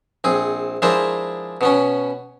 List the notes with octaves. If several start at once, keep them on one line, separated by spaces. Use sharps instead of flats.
A#1 C4 G#4
F3 G#3 D4 E4 A#4 C5
B2 B3 C#4